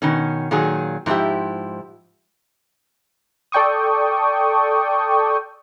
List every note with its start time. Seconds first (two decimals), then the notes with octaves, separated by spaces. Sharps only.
0.02 B2 D#3 C#4
0.51 A#2 D#3 F#3 G#4
1.06 G#2 F3 F#3 E4 G4
3.52 A4 D5 G5 C#6 D#6